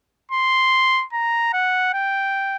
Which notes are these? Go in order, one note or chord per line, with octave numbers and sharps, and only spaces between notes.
C6
A#5
F#5
G5